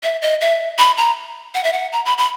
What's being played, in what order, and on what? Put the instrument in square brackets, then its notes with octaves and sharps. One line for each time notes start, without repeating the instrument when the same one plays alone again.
[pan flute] E5
D#5
E5
B5
A#5
F#5
E5
F#5
A#5
B5
B5